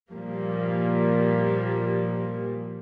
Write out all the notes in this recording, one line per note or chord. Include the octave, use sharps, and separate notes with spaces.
A#2 F3 G3 A#3